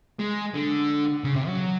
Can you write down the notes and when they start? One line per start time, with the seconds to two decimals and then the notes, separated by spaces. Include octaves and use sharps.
0.20 G#3
0.55 D3
1.24 C#3
1.36 C3
1.47 F#3